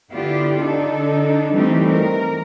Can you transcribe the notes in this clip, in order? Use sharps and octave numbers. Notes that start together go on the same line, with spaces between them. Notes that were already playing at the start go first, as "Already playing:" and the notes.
D3 B3 E4 F4 G4 D5
D3 D4 D#4 A4
E3 G3 A3 C4 D#4 G4
A#4